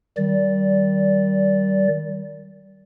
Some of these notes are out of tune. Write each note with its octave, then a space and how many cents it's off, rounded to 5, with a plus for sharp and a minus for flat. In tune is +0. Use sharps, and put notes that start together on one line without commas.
D#3 +0 G3 -25 D5 -15